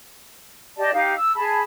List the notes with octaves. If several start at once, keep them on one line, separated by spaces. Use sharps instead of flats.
G4 D5 D#5 A5
D#4 G4 F5
E6
G#4 G#5 A5 B5